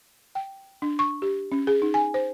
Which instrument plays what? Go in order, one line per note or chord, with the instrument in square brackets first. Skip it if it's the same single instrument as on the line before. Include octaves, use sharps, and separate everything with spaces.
[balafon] G5
D4
C#6
G4
C#4
G#4
D#4
G#5
C5